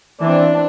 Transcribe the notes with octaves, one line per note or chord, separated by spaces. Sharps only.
E3 C4 D4